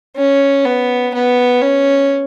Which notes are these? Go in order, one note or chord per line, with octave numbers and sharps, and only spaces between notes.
C#4
B3
B3
C#4